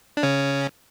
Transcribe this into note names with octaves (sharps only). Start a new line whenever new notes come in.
D4
C#3 C#4